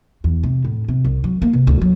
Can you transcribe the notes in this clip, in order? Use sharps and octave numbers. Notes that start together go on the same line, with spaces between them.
E2
C3
A2
C3
C2
F#3
A#3
C3
D2
F#3